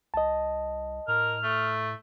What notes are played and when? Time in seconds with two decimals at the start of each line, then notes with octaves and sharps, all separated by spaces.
0.14 C2 D#5 A5
1.08 A2 A#4 F6
1.43 A3